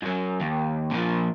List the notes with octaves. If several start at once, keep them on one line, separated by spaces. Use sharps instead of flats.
F#2 F#3
D#2
A#2 F3